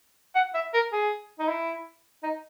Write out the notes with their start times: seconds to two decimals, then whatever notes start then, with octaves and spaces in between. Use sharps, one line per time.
0.35 F#5
0.55 E5
0.74 A#4
0.92 G#4
1.39 D#4
1.48 E4
2.23 D#4